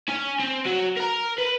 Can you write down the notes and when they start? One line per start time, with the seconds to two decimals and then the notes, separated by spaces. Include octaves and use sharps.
0.08 C#4 G#5
0.40 C4
0.66 F#3 F#4
0.97 A#4 A#5
1.38 B4